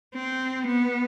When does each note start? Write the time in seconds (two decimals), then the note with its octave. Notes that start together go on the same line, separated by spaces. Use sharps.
0.15 C4
0.66 B3